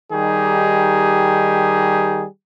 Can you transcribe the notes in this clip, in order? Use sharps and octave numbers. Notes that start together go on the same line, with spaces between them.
D#3 G3 D#4 G4 G#4